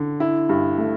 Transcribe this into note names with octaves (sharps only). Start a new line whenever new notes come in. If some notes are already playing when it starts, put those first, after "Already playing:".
Already playing: D3
E4
G2
A3